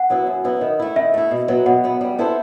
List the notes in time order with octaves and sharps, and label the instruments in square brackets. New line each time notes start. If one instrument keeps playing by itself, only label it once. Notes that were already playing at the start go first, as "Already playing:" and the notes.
Already playing: [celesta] F#5
[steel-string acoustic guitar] F#3 B3 E4
F#2
F#3 B3 E4
D#3
A3 E4
[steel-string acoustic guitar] D#3 [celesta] E5
[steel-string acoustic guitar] A3 E4
B2
F#3 B3
[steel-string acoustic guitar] B2 [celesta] F#5
[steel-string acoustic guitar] F#3 B3
G3
B3 E4 A4 C5